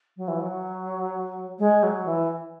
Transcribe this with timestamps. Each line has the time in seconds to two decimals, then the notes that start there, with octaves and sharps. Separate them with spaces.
0.17 F#3
0.28 E3
0.40 F#3
1.59 G#3
1.83 F#3
2.06 E3